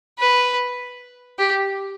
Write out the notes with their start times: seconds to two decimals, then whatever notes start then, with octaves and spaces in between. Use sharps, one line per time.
0.19 B4
1.39 G4